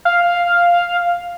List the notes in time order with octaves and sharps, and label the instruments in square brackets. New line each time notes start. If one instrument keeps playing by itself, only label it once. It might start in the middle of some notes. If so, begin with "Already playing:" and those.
[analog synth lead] F5